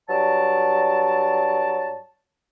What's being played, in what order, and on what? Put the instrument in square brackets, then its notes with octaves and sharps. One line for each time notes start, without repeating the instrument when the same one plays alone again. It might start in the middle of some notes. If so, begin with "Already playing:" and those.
[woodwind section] G2 F#3 D5 A5